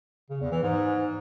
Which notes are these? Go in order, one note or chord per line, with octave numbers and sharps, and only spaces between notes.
C#3
E2
E3
G#2